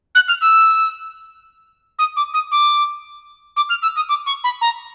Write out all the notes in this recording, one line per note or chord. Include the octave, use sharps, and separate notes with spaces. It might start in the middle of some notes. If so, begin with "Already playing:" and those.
F#6
F6
E6
D#6
D6
D#6
D6
D6
F6
E6
D#6
D6
C#6
B5
A#5